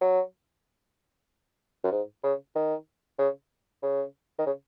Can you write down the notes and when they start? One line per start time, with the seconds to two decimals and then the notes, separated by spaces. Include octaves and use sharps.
0.01 F#3
1.84 F#2
1.91 G#2
2.23 C#3
2.55 D#3
3.18 C#3
3.83 C#3
4.38 D#3
4.46 C#3